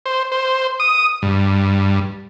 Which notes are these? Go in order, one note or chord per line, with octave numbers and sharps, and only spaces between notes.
C5
C5
D#6
G2